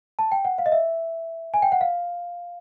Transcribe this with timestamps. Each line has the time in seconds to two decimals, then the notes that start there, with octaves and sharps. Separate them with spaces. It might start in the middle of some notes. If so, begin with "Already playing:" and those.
0.19 A5
0.32 G5
0.45 F#5
0.58 F5
0.66 D#5
0.72 E5
1.54 G#5
1.62 G5
1.72 F#5
1.81 F5